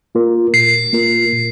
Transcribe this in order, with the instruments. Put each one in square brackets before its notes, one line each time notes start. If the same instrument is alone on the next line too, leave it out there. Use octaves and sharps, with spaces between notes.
[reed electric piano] A#3 F4 A#4
[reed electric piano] A#2 [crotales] C7
[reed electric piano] A#3 F4 A#4
A#2